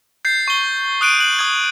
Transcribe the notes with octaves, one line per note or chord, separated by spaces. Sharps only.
G6 A6 C7
C#6 G7
D#6 F#6 D7 D#7
F#6 F#7
D#6 G#6